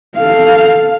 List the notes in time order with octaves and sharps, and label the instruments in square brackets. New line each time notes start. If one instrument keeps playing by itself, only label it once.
[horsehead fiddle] A4 F5